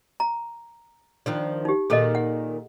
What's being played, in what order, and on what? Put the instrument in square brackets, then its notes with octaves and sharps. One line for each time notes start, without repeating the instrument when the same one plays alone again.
[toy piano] A#5
[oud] D#3 F3 D4
[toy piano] D#4 G4
[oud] A#2 D#3 [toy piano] G#4 A4 D#5
[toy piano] F#5